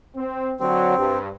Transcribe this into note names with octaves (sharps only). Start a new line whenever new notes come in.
C4
D3 F#3 C4
G2